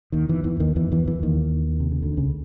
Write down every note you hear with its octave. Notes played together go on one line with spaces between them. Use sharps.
D#2 D#3
E2 E3
E2 E3
D#2 D#3
E2 E3
E2 E3
E2 E3
D#2 D#3
C3
C#3
D2 D3
C#2 C#3